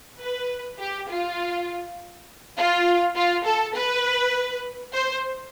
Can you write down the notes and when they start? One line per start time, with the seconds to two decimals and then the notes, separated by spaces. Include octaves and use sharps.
0.21 B4
0.79 G4
1.09 F4
2.57 F4
3.15 F4
3.45 A4
3.75 B4
4.93 C5